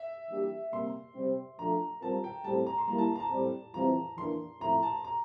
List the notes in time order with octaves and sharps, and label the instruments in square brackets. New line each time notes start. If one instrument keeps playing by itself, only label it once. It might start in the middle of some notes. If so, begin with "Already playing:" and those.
Already playing: [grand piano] E5
[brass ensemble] E3 G3 A#3 D4 G4
[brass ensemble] C3 G3 A#3 [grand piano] C6
[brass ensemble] C3 G3 C4
[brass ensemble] F3 A3 D4 F4 A4 [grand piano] A#5
[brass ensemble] G3 C4 F4 A#4 [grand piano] A5
[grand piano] G5
[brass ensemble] A2 G3 C4 G4 [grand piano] A5
[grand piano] A#5
C6
[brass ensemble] G3 A#3 E4 [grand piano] A#5
[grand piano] A5
A#5
A5
[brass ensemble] A2 G3 C4
[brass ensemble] E3 G3 C4 F4 [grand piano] A#5
[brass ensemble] E3 A#3 D4 [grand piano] C6
[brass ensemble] A2 F3 A3 C4 E4 [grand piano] A#5
[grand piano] A5
A#5